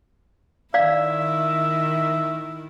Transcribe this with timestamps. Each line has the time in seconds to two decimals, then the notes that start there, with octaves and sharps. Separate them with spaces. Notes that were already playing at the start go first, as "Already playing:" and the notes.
0.74 D#3 E4 D5 E5 F5